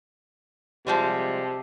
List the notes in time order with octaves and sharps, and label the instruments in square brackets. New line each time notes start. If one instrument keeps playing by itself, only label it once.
[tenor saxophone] C3 [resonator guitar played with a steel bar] F3 G3 G#3